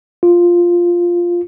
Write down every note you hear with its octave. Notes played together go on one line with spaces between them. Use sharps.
F4